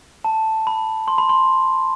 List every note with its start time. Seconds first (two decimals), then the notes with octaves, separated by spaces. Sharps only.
0.25 A5
0.67 B5
1.08 C6
1.18 B5
1.29 C6